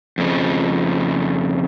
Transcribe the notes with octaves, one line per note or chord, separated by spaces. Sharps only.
F2 C#3 F3